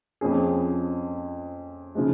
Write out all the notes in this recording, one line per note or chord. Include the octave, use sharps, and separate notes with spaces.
F2 F3 C#4 G#4
C#3 F3 G#3